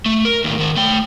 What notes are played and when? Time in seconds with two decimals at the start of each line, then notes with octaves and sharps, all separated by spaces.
0.06 A3
0.25 A#4
0.44 D#2 A2
0.59 D#3 C5
0.77 A3 G5